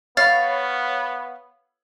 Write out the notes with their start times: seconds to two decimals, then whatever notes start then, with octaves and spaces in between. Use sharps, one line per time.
0.17 B3 C#5 F5 B5 A6